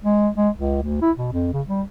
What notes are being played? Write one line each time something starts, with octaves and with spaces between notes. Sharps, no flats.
G#3
G#3
C#2
D2
E4
B2
F2
C#3
G3